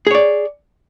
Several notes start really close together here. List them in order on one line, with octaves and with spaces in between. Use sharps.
G#4 C#5 D5